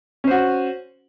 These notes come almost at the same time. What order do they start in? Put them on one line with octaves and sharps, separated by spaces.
C#4 C5 F#4